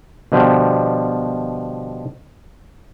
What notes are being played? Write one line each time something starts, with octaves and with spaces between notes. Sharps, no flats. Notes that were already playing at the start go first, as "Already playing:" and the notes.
B2 D3 F3 G3